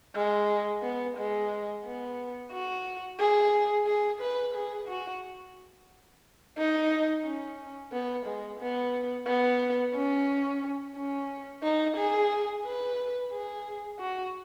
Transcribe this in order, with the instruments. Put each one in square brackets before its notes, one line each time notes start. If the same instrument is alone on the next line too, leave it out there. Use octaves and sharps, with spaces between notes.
[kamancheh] G#3
B3
G#3
B3
F#4
G#4
G#4
B4
G#4
F#4
D#4
C#4
B3
G#3
B3
B3
C#4
C#4
D#4
G#4
B4
G#4
F#4